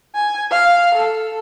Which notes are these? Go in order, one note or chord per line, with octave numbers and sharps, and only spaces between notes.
G#5
F5
A4